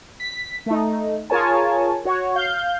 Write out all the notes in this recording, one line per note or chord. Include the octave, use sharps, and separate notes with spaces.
B6
A3 D#4
F4 G#4 A#4 C#5 G#5 A5
F#4 C#5
F5 G6